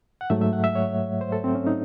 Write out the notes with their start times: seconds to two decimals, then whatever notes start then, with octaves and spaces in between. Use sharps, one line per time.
0.21 F#5
0.30 G#2 F#3 A3 E5
0.41 E5
0.53 F#5
0.64 E5
0.75 C#5
1.21 C5
1.32 A4
1.44 C4
1.55 C#4
1.67 D#4